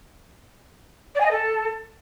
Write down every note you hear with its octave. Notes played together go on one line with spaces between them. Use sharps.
D5
G#5
D#5
A4